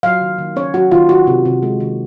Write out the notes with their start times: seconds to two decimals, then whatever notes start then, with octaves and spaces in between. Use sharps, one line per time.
0.03 F#3 F5
0.21 D#3
0.38 D#3
0.56 C#4 C#5
0.74 F#3 F#4
0.91 D#3 F4
1.09 D#3 F#4
1.27 C3
1.45 C3
1.63 G#3
1.80 D#3